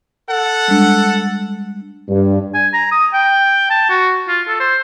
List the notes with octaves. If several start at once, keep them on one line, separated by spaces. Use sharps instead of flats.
A4 F#5
G3 G#3 D4
G2
G#5
A#5
D#6
G5
A5
F#4
F4
A4
C5